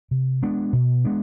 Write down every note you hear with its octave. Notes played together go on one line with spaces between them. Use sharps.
C3
G#3 B3 D4
B2
G#3 B3 D4